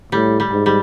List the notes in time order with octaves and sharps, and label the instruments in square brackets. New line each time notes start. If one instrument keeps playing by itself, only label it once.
[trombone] A2 [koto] G3
[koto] G3
[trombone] G#2
[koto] G3